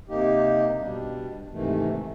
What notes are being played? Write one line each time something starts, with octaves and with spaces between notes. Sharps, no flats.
C3 A#3 D#4 G4
B2 G3 D4
G#2 C3 D#3 E3 A3